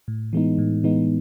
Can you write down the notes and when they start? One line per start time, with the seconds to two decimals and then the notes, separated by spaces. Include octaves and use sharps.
0.08 A2
0.33 E3 G#3 B3 D#4
0.58 A2
0.84 E3 G#3 B3 D#4